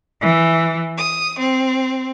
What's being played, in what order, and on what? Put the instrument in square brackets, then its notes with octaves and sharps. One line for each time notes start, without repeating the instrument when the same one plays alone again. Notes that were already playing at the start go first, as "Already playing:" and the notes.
[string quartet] E3
D#6
C4